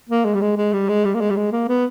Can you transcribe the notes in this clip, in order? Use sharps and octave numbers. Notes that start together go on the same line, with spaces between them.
A#3
G#3
G3
G#3
G#3
G3
G#3
G3
A#3
G#3
G3
G#3
A#3
B3